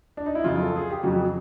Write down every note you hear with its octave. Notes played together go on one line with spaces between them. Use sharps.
D4
D#4
E4
F2 C#3 F#3 F4
A4
G#4
G4
F2 C#3 F#3 F#4